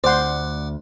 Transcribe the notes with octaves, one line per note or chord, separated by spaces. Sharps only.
D2 C5 D5 F#5 C6